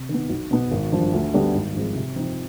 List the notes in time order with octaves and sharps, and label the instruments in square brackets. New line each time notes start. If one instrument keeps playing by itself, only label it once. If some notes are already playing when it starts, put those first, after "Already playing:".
Already playing: [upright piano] C3
D#3
B3
B1
B2 B3
G#1
G2 F3
D2
D3 G3 B3 D4
G#1
G#2 F3 G#3 C4
C3
F3 C4 D#4